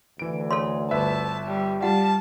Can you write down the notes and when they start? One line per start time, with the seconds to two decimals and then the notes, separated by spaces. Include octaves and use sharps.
0.19 D2 E3 D7
0.51 A4 C#5 C6
0.91 G1 B4 E5 A5
1.47 G3
1.82 G3 F4 F#5 A5